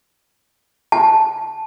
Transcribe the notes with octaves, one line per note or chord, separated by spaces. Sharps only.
A5